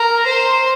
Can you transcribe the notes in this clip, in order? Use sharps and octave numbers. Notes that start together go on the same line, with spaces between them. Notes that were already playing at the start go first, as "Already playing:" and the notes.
Already playing: A#4
C5